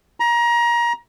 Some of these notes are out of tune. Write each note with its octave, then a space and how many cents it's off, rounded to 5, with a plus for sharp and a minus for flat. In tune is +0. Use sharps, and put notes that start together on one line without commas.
A#5 +25